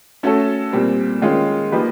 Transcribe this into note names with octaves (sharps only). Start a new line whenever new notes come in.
A3 C#4 F#4 A4
A#2 G3 C4
D#3 G#3 C#4 F4
F3 A#3 D#4 G4 B4